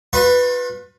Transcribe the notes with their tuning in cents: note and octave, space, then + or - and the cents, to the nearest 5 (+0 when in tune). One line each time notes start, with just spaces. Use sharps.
F4 +35 B4 +0 C#6 -45